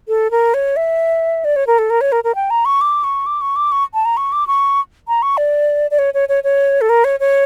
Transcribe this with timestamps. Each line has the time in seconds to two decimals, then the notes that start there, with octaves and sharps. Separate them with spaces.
0.08 A4
0.31 A#4
0.54 C#5
0.76 E5
1.45 D5
1.56 C#5
1.67 A#4
1.79 A4
1.90 A#4
2.01 C#5
2.12 A#4
2.24 A#4
2.35 G5
2.50 A#5
2.65 C#6
2.81 D6
3.04 C#6
3.26 D6
3.41 C#6
3.56 D6
3.72 C#6
3.94 A5
4.05 A#5
4.17 C#6
4.32 D6
4.47 C#6
5.08 A#5
5.22 C#6
5.37 D5
5.91 D5
5.99 C#5
6.14 C#5
6.29 C#5
6.44 C#5
6.81 A4
6.89 A#4
7.04 C#5
7.20 C#5